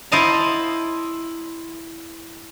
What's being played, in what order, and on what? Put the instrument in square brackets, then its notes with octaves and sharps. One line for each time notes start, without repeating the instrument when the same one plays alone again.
[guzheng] E4 C5 D#5 A5 A#5